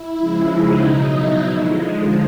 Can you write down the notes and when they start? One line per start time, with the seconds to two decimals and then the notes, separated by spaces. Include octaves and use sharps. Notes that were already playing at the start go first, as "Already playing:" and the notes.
Already playing: E4
0.17 C#3 F3 G#3
0.50 D#4
0.82 B2 F#3
1.15 E4
1.47 D3 F3 G#3